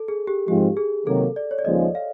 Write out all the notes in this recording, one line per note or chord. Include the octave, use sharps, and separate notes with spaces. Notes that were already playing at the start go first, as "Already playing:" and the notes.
Already playing: A4
G#4
G4
G#2 F3 G#3 C4 F4 G4
G#4
C3 D#3 F#3 A#3 A4
D5
C#5
D5
D#2 C#3 F3 G#3 D#5
F5